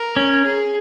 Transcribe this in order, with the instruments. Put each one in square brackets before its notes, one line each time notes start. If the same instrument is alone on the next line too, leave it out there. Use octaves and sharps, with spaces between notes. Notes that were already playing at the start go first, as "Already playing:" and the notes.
Already playing: [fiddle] A#4
[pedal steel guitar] C#4
[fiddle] G#4